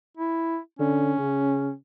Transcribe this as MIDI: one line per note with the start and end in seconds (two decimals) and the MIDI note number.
0.17 0.58 64
0.79 1.11 50
0.79 1.74 61
1.18 1.70 49